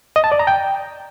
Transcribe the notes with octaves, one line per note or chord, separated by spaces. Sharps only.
D#5
A5
D5
A#5
G5